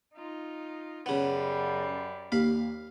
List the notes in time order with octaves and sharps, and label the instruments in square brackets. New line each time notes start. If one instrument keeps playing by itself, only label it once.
[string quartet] D#4 F4
[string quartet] F#2 G3 [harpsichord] C#3 B3
[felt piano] D#2 [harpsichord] F5 B5